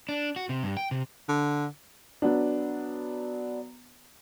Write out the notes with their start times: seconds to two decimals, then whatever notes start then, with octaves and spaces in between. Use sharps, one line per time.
0.09 D4
0.36 F#4
0.49 C3
0.63 G2
0.77 G5
0.91 C3
1.29 D3
2.22 F#3 B3 D4